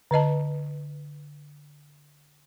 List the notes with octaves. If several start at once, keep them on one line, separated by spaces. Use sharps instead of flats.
D3 B4 D#5 A5